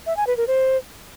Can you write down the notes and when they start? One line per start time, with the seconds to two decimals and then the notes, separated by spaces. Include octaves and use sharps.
0.06 E5
0.17 G#5
0.27 B4
0.37 A#4
0.47 C5